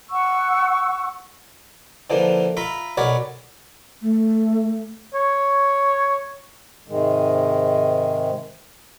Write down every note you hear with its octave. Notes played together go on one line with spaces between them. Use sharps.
F#5 C#6 E6
D3 E3 F3 A#3
F4 E5 A#5 B5
B1 A#4 C#5 D5 F#5 B5
A3
C#5
G#2 C3 D#3 G#3